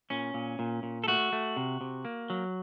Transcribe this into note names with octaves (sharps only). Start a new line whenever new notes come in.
A#2 C#4
A#2
A#2
A#2
A4
A3 F#4
A3
C3
C3
A#3
F#3